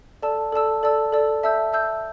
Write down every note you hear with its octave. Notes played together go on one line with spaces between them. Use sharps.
A4 D5 A5 E6
A4 D5 A5 E6
A4 D5 A5 E6
A4 D5 A5 E6
E5 A5 E6 G6
E5 A5 E6 G6